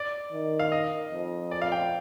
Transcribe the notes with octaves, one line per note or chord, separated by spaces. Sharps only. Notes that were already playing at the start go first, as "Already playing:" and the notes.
Already playing: D5
D#3
F5
D#5
F2
D5
F5
G5